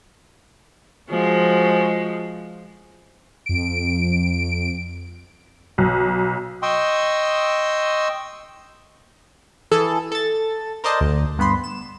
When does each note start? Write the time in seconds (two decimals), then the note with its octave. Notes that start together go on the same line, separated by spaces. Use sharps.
1.10 F3 G#3 F#4
3.46 F2 D7
5.78 B1
6.62 D#5 G5 C6 C#6 D#6 E6
9.71 E3 G#4 A4
10.12 A4 A6
10.84 A#4 C5 D5 D#5 A5
11.01 D2
11.39 G2 B3 B5 C6
11.64 E7